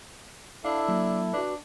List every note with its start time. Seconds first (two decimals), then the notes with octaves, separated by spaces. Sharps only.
0.64 D4 E4 A4 E5 F5
0.88 F#3 A#3
1.33 D4 F#4 B4